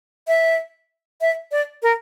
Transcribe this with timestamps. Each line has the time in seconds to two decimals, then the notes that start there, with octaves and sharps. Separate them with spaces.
0.28 E5
1.21 E5
1.52 D5
1.83 A#4